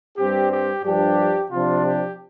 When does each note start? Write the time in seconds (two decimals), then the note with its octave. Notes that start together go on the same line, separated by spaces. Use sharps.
0.18 G2 G3 C4 G4
0.52 G4
0.85 G2 F3 D4 G4
1.51 C3 F3 D4 F4
1.85 G4